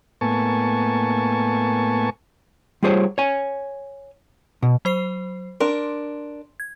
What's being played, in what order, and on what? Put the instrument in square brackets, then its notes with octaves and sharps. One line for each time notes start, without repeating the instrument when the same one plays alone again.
[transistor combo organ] A2 A#3 B3 G#5 A5 C#6
[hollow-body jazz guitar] G3 F4 G#4 C5 C#5
C#5 G#5
B2
[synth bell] F#3 C5 C7
[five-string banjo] D4 A#4 [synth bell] C6
[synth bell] G#6